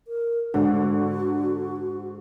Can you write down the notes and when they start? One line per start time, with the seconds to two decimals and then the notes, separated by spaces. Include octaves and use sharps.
0.08 A#4
0.54 G#2 D3 F#4